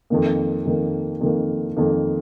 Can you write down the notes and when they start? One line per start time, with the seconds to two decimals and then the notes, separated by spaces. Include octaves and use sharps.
0.10 F2 D#3 A#3
0.65 F2 D#3 A#3
1.21 F2 D#3 A#3
1.77 F2 D#3 A#3